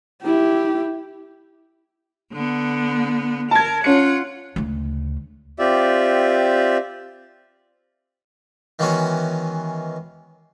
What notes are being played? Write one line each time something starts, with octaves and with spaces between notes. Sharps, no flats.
E4 G4
D3 B3
A#4 A5 G#6
C#4 F4 F#5 C#7
D2 C#3
C4 F4 G4 D5 E5
D#3 E3 G#3 B3 C#4 F#4